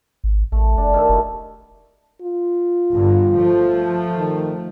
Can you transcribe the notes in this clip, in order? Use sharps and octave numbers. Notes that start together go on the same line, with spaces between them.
G#1
A1 A3
F#1 D4
D#3 G4 A4
F1 E4 F#4
F4
G1 G2 D3
F3 A3
D#3